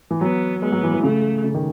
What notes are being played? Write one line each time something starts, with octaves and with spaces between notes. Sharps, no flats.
E3
F#3 B3
G#3 B3
F#3
E3
E3
C#3 A3
C#3
D#3